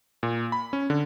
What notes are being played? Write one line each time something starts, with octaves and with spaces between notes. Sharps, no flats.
A#2
B5
C#4
D3